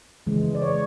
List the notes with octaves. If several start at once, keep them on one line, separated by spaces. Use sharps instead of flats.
C#3 E3 G#3
D5
C#5